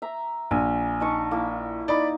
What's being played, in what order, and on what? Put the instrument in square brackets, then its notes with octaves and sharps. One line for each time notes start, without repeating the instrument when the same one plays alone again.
[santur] E5 A#5
[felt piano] A#1 [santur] G#5
[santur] D#4 A5 C#6
A#3 E4
[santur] D#4 [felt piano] D5 B5